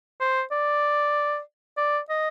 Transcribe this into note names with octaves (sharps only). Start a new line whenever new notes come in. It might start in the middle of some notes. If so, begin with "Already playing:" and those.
C5
D5
D5
D#5